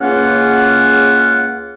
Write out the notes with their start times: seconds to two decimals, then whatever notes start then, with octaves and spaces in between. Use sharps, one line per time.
0.01 C#2 C#3 A#3 C#4 F4 F#5